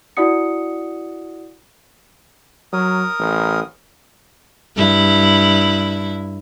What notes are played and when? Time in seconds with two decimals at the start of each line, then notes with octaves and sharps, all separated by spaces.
0.17 E4 F#4 D5 F#5 D#6 C#7
2.73 F#3 A#4 D#6
3.19 A1
4.76 G2 E4